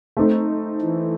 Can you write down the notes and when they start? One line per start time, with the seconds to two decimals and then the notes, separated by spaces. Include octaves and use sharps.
0.17 A3 C4 D#4
0.82 E3